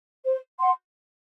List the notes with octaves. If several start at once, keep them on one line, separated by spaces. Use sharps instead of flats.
C5
F#5 C6